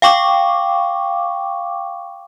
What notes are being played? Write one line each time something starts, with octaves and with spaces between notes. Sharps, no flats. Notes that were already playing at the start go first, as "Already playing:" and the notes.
F5 G5 C#6 D6